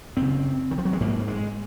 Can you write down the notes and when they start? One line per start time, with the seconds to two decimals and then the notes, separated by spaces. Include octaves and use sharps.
0.17 F#2 C#3 C4
0.71 D#3
0.78 F3
0.85 F#3
0.93 G#3
1.00 G#2 A#3
1.28 G#3